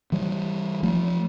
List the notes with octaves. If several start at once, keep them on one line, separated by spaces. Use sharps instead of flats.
E3 G3
F3 A3